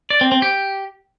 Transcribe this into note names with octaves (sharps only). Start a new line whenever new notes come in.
D5
C4
C4
G4